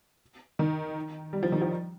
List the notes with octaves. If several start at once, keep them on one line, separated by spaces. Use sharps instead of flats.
D#3
G3
F3
D#3
F3